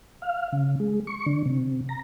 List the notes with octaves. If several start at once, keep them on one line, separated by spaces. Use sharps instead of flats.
F5
C#3
G#3
C#6
D3
C3
A#5